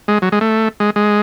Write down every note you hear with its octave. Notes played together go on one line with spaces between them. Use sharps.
G#3
F#3
G#3
A3
G#3
G#3